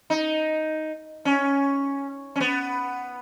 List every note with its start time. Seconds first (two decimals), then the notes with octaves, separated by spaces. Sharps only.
0.10 D#4
1.25 C#4
2.36 C#4
2.40 B3